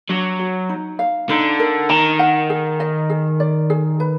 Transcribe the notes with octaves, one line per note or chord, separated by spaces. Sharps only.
F#3 D4
F#4
D#4
F5
D3 D#4
A#4
D#3 A#5
F#5
G#4
D#5
G#4
D5
G#4
B4